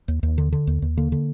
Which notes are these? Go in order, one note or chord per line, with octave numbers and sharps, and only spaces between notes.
D#2
D#2
D3
D3
D#2
D#2
D3 A#3
D3